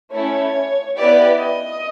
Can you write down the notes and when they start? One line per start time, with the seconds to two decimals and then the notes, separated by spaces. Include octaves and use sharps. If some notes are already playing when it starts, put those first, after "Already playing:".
0.12 A3 C#4 E4 A4 C#5
0.97 B3 E4 G4 B4 D5
1.39 D#5